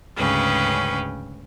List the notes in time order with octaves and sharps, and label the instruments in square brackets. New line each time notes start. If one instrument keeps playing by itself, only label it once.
[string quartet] D2 G#2 C#3 C#4 B4 G5